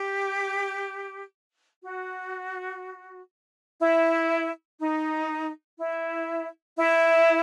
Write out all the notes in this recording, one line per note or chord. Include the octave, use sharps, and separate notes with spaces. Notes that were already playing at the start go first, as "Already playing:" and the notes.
Already playing: G4
F#4
E4
D#4
E4
E4